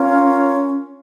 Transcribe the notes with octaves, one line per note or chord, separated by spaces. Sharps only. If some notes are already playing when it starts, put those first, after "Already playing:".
Already playing: C#4 F4 A#4 C#5 F5